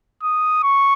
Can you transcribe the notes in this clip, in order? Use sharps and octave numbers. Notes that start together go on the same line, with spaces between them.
D#6
C#6